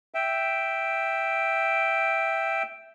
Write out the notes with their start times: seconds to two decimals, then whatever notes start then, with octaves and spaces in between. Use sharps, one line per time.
0.14 E5 G5